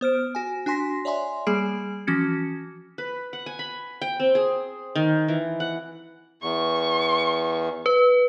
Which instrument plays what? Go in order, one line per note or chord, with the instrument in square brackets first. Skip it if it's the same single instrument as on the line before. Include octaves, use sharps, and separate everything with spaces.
[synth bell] B3 C5 F6 D7
F#4 G#5
D4 F#4 G#5 C6 A#6 B6
C#5 D5 E5 G#5 C6
G3 A#3 G#4 G#5 D7
E3 F3 C#4 F#4 G#6 C#7
[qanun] B4
F#5
G#5
B5
G5
C4
G#4
D#3
E3
F#5
[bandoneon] E2 [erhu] C#6
[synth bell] B4